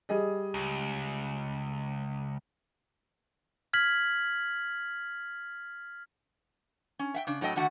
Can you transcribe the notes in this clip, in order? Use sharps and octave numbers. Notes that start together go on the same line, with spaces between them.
G3 G#4 D#5
C#2
F6 G#6 B6 F#7
C#4
E5 F#5 G5
C#3 D4
A2 F#3 A4 D#5 G5
D3 D#3 A3 F#4 F#5